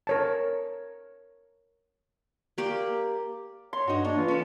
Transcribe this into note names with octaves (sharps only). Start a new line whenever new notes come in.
A#4 C#5 A5
A#3 G4 D5
C#5 C6
G2 D#4 F#4
A#3 D4 C#5
E3 F4
C#4 A4